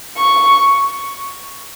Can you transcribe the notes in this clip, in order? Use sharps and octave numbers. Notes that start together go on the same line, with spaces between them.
C#6